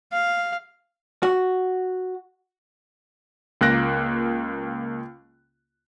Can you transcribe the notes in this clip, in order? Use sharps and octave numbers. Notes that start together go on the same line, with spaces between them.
F5
F#4
C#2 A#3 F4 F#6 A#6 D7